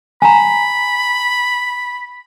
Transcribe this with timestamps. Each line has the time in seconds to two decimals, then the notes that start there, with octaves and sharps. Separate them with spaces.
0.22 G#5 A#5 B5